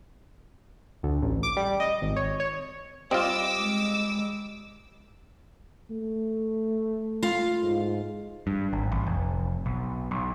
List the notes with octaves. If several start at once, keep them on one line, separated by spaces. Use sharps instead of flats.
D2
A1
D6
G3
D#5
G#1
C#5
C#5
G3 C4 F4 D#5 D6 E6 D7
G#3
A3
F4 F5
G#2
G2
G#1
A1
F1
B1
B1